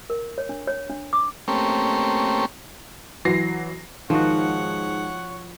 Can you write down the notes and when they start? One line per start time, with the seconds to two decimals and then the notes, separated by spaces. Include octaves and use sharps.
0.10 A#4
0.38 C#5
0.49 D4
0.67 C#5
0.90 D4
1.13 D6
1.48 A3 A#3 C4 C#4 G4
3.25 E3 F#3 A#6 C7
4.10 G#2 D#3 F3 F#4 C#5 F#5